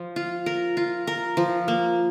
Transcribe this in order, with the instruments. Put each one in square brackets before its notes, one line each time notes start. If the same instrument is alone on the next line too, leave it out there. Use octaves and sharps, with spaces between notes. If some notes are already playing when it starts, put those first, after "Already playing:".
Already playing: [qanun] F3
F4
A#4
F4
A#4
F3
A#3